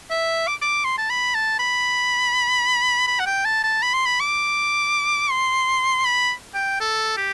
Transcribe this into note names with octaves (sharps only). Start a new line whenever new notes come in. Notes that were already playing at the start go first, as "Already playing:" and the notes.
E5
D6
D6
C6
A5
B5
A5
B5
B5
F#5
G5
A5
A5
B5
C6
B5
D6
C6
B5
G5
A4
G4